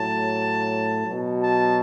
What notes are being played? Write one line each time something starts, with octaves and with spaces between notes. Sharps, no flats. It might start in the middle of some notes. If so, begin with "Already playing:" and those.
Already playing: A2 F#3 A5
B2 F#3
A5